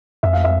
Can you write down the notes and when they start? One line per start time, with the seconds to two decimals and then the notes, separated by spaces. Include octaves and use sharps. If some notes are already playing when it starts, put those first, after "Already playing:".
0.23 F2 E5
0.33 F5
0.44 E5